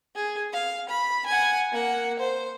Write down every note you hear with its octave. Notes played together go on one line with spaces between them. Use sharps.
G#4
F5
B5
F#5 G#5
A#3 F#5
C5